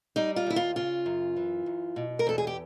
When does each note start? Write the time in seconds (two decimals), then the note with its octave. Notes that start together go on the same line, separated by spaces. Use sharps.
0.16 G3 D#4
0.36 F4
0.46 D#2 E4
0.56 F4
0.76 C#3 F4
1.06 F#2
1.36 E3
1.66 F#2
1.96 B2
2.19 A#4
2.27 E2 A4
2.38 G#4
2.47 G4